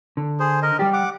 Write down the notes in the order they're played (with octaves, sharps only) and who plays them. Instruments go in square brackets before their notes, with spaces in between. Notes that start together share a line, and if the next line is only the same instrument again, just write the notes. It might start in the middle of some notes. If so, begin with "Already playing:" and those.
[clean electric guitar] D3
[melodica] G#4 C5
A#4 D#5
[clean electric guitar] G3 G4 [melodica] D5
[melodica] F#5 D6